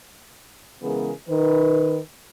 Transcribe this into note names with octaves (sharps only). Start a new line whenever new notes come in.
C#3 E3 G#3 B3 G#4 A#4
D#3 B4